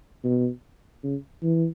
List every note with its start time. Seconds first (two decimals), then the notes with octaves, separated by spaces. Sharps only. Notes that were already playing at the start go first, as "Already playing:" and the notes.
0.24 B2
1.03 C#3
1.43 E3